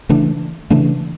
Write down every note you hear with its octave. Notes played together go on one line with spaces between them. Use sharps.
C#3 E3 A3 D4
C#3 E3 A3 D4